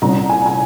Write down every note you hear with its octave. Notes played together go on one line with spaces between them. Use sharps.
C2 A#2 G3 C#4 A#5
G#5
G#5